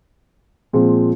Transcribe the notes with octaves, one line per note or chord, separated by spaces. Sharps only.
A#2 F3 G#3 C4